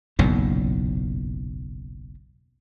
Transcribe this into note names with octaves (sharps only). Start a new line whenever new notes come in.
F#1 B1 E2 A#2